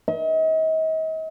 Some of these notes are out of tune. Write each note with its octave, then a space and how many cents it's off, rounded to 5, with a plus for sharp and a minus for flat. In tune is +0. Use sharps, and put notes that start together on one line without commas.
D#5 +40